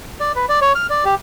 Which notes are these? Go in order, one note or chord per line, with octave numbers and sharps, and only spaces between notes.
D5
B4
D5
C#5
F6
D5
G4